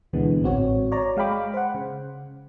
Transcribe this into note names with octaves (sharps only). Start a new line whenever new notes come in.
D2 B2 D3 E3 G#3 B3
A1 G#2 C4 F#4 C#5
C#5 D5 A#5
G#3 F5 G5 B5 D6
C5 F#5
C#3